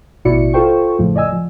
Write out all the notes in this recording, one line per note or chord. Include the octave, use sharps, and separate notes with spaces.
A1 B2 E4 F#4 D5 C#7
F4 A4 C5 G5 C#6
A#1 F2 A2 C#3 F3
D5 D#5 G#5 E6
F3